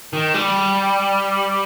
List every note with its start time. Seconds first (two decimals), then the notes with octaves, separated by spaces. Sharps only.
0.13 D#3
0.35 G3